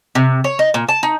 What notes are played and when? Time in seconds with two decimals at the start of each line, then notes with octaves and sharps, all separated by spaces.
0.15 C3
0.44 C#5
0.59 D#4
0.74 A#2
0.89 A5
1.03 D#4